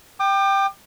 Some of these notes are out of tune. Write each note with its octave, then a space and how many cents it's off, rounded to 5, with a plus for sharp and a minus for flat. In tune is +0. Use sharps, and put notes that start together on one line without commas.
G5 +0 D6 +35